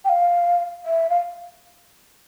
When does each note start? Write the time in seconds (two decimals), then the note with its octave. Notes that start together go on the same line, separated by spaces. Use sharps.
0.05 G5
0.09 F5
0.86 E5
1.10 F5